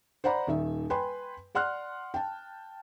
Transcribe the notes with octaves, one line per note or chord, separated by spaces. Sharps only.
C5 D5 F#5 A#5 B5
D#1 D#3 E5
B4 G5 G#5 B5 C6
D5 F#5 C6 F6 F#6
G5 A5